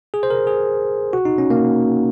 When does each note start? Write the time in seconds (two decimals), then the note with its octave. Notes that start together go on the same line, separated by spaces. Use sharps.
0.14 G#4
0.23 C5
0.30 A#4
0.47 G#4
1.13 F#4
1.25 D#4
1.38 C#4
1.50 A#3